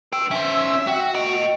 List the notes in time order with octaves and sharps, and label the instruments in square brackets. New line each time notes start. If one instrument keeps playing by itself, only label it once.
[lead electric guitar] B4 G5 [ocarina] E6
[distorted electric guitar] C#4 C5 [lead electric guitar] E5
[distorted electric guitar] F#4 [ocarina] G5
[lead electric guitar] A2 G5 [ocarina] D#5